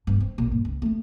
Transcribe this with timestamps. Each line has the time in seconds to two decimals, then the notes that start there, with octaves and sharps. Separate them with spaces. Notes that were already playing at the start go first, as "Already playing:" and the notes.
0.07 G2 B3
0.20 C4
0.38 A1 A#2
0.51 G2
0.65 C#2
0.82 A3 C4